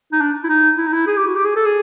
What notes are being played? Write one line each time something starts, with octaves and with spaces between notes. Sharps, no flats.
D#4
D4
E4
D#4
E4
D#4
E4
G#4
G4
F#4
G4
G#4
A4
G#4